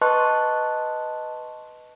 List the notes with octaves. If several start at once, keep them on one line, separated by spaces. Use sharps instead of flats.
B4 D#5 A5 C6 C#6 F#6